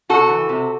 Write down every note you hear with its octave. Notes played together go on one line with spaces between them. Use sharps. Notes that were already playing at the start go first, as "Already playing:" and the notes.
C3 F#4 A4
E3
C3